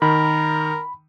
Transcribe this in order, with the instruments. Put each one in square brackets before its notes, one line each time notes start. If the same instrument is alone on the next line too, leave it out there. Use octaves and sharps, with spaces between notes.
[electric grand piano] D#3 [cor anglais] A#4 [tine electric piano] B5